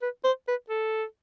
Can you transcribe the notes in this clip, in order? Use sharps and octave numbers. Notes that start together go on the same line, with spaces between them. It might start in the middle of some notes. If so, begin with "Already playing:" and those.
B4
C5
B4
A4